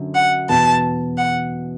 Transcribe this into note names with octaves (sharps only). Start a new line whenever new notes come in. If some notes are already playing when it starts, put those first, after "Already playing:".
Already playing: F#2 D3
F#5
E2 B2 B3 A5
F#5